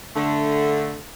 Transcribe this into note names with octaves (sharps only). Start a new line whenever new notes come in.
D3 A3